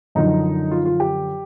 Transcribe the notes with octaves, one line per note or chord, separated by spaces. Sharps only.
F#2 D3 F3 D#4
F4
F4
G4